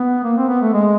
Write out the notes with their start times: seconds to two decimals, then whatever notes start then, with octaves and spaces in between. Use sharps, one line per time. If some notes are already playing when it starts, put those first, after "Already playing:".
Already playing: B3
0.24 A#3
0.37 C4
0.48 B3
0.62 A3
0.74 G#3